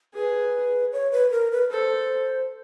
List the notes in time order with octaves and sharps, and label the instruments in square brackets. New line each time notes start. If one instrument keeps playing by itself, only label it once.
[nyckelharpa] G#4 [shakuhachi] B4
[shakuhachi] C#5
B4
A#4
B4
[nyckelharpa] A4 [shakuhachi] C5